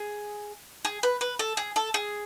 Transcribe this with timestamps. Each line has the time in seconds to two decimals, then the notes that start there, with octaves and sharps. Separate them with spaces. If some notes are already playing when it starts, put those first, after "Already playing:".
Already playing: G#4
0.85 G#4
1.03 B4
1.21 B4
1.39 A4
1.57 G#4
1.76 A4
1.94 G#4